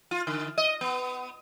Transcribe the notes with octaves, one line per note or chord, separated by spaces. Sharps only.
F4
D3
D#5
B3